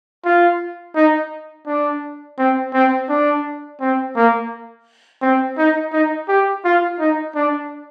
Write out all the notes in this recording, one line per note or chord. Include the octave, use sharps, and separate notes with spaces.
F4
D#4
D4
C4
C4
D4
C4
A#3
C4
D#4
D#4
G4
F4
D#4
D4